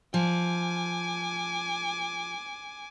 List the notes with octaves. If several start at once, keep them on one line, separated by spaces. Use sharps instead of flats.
F3 G#5 D6